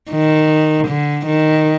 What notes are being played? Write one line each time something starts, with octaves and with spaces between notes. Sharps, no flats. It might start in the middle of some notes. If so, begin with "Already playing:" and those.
D#3
D3
D#3